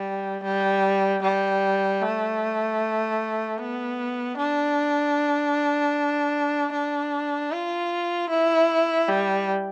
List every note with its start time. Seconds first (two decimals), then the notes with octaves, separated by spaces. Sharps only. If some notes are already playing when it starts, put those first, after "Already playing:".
Already playing: G3
0.44 G3
1.23 G3
2.02 A3
3.58 B3
4.37 D4
6.73 D4
7.52 F4
8.30 E4
9.09 G3